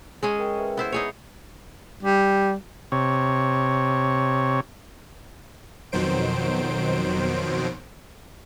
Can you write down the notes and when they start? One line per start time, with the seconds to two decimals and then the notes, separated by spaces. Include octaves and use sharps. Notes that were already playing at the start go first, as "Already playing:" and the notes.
0.23 G#3 C#4 G#4 D#5 C#6
0.39 A#4 G5 G#5
0.58 A4 B4 E5
0.77 B3 E4 C5
0.92 D#4 G#4 C#5
2.03 G3
2.92 C3 C#5
5.92 F2 B2 D#3 F#3 C5 D7